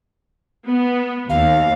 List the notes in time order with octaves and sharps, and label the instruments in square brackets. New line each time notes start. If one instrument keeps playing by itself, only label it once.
[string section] B3
[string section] D#2 [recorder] F5